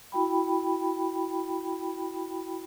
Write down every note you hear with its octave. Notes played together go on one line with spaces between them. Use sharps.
E4 F#4 G5 B5